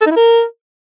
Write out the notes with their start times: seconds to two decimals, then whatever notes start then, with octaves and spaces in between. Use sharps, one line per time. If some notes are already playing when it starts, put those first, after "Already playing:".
0.01 A4
0.06 D#4
0.11 E4
0.16 A#4